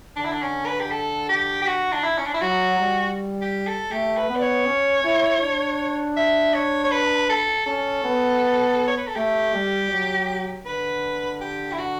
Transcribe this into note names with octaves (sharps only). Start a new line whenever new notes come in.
D3 D4
E4
D4
C#4
B4
G4
A4
G4
G4
F#4
D4
E4
C#4
D4
E4
F#3 F#4
G3
G4
A4
A3 G4
B4
B3
D5
C#5
C#4
E4
D4
E5
C#5
C#5
B4
A4
C#4 A4
B3
C#5
B4
A4
A3 G4
G3
F#3
D3 B4
G4
E4
F#4